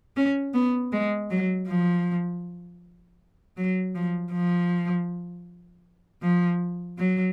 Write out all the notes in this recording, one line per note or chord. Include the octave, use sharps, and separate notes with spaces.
C#4
B3
G#3
F#3
F3
F#3
F3
F3
F3
F#3